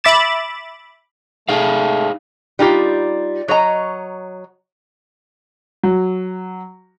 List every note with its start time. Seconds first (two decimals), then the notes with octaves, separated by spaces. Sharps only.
0.04 E5 B5 D6 A6 E7
1.49 A3 D#4 G#4 F5
2.59 G3 D#4 F4 G4
3.48 F#3 C#5 D#5 A#5
5.83 F#3